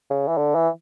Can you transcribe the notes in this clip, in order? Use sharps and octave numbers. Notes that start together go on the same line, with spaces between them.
C#3
E3
D3
E3